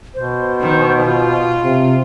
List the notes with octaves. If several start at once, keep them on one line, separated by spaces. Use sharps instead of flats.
B2 C5
D#3
F4
C3